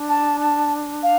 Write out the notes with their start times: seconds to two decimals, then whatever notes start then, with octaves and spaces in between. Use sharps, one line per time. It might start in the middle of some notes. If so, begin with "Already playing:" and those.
Already playing: D4
0.09 A5
0.40 A5
1.03 F5